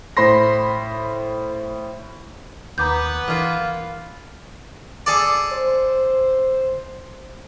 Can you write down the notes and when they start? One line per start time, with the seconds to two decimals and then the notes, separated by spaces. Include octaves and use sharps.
0.17 A2 C5 B5 C6 A#6
2.78 D#2 B3 B4 A#5 D6 G6
3.28 E3 A#3 F4
5.06 G#4 A4 D5
5.53 C5